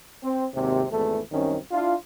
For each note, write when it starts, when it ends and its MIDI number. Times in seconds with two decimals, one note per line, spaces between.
0.23 0.45 60
0.54 0.83 32
0.54 0.83 39
0.54 0.83 48
0.91 1.20 32
0.91 1.20 40
0.91 1.20 52
0.91 1.20 57
0.91 1.20 69
1.32 1.57 36
1.32 1.57 42
1.32 1.57 48
1.32 1.57 51
1.32 1.57 61
1.72 1.95 62
1.72 1.95 64
1.72 1.95 65